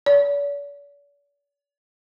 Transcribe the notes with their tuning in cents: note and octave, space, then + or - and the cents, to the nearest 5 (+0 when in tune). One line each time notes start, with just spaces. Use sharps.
D5 -45